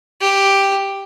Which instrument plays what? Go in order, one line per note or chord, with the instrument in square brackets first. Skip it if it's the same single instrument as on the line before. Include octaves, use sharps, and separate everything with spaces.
[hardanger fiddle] G4